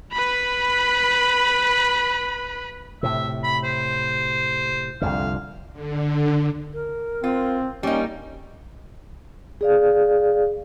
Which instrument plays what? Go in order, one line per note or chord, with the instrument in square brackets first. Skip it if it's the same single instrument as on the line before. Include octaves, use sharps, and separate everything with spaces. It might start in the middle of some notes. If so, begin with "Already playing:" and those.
[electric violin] B4 B5
[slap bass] A2 C3 [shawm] E5
[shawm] B5
C5
[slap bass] C2 F2 D3 [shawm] F5
[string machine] D3
[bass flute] A#4
[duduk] C4 [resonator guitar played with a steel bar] F4
[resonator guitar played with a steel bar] G3 D#4 [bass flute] A#3 [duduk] C#4
[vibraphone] G#4 D5 F5